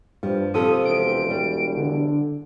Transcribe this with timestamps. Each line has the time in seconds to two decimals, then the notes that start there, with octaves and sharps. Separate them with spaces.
0.23 G2 F3
0.54 C3 F3 A4 D#6
0.85 E1 D7
1.30 G3
1.77 D3